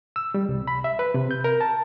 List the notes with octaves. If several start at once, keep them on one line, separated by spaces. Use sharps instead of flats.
E6
G3
C2
B5
E5
B4
C3
G6
A#4
A5